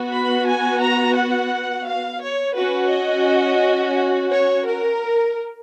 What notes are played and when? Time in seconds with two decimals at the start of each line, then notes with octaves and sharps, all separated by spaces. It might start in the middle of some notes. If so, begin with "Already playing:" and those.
Already playing: B3 F#4
0.12 B5
0.47 G#5
0.81 A#5
1.16 F#5
1.86 F5
2.21 C#5
2.56 C#4 F#4 B4
2.90 D#5
4.31 C#5
4.65 A#4